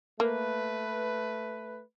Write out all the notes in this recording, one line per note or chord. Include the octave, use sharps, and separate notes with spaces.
A3 A#3 B4